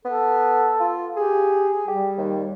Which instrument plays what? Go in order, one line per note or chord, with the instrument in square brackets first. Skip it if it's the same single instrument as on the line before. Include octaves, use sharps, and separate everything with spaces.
[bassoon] B3 [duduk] A4
[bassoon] F4
[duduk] G4 [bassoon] G#4
[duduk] G3 [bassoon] G4
[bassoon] D#2